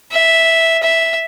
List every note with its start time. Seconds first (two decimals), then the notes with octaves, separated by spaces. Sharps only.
0.13 E5
0.83 E5